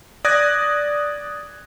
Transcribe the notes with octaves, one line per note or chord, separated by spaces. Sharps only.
D5 D#6 F#6 G#6 A#6